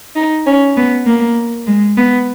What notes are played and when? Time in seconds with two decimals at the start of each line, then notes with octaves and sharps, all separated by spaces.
0.16 D#4
0.46 C#4
0.77 B3
1.06 A#3
1.66 G#3
1.97 B3